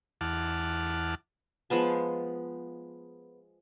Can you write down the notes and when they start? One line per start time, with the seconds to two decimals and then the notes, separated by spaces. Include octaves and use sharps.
0.21 E2 F#5 A5 D6 F6
1.70 F3 G#3 B3 A5